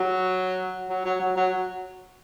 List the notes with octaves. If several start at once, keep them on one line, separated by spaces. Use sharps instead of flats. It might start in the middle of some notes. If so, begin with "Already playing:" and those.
Already playing: F#3
F#3
F#3
F#3
F#3